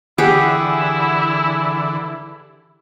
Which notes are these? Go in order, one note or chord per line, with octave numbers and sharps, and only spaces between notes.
D3 E3 E4 G4 G#4 F#5